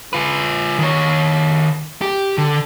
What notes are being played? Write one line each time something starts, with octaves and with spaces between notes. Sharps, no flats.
F4 B4
D#3 C#5
G4
D3